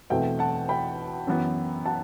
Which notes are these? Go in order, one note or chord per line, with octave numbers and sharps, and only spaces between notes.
E2 B2 A3 C4 E5 G5
F#5 A5
G5 B5
F#2 E3 B3
F#5 A5